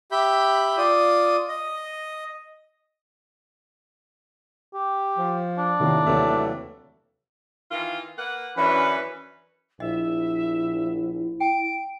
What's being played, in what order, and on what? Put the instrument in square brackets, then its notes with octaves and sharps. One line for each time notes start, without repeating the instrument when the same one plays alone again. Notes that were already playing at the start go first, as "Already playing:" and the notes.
[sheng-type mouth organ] G4 E5 B5 G6
F4 D5 D#6
D#5
[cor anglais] G4
[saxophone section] F3
[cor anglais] D4
[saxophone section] A2 [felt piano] C3 D#3 A#3
[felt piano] D#2 C3 [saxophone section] E3 F#3 A3
[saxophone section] D#3 E3 F4
A#3 B4 F#5
[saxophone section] F#2 D4 [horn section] E3 C#4 B4
[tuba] A#1 [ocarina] E4 [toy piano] D#5 [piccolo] E5
[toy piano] G5 [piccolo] D7